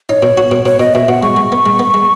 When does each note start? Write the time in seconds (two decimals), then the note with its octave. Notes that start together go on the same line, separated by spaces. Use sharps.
0.09 D#4 C#5
0.22 B2
0.37 F#4
0.51 B2
0.65 B2 C#5
0.80 B2 D#5
0.94 B2 E5
1.08 B2 F#5
1.23 G#3 C#6
1.37 G#3
1.52 B3
1.66 G#3
1.79 B3
1.94 G#3